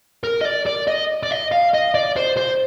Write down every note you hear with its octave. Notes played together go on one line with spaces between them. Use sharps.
A#4
D#5
D5
D5
D#5
D5
D#5
F5
D#5
D5
C5
C5